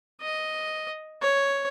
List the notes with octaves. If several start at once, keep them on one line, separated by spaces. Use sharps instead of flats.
D#5
C#5